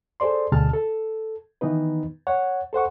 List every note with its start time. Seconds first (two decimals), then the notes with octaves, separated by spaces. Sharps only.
0.20 G#4 A4 C5 D5 C6
0.52 D2 B2 D3 G#4 A5 F6
0.74 A4
1.61 D#3 E3 B3 D#4 B4
2.27 C#5 F#5
2.73 A4 C5 F#5 C#6